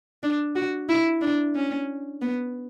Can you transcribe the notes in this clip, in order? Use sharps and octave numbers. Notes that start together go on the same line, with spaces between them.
D4
F#4
E4
D4
C#4
B3